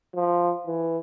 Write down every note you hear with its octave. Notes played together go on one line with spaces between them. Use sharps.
F3
E3